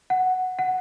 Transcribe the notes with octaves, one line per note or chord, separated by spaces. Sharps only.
F#5
F#5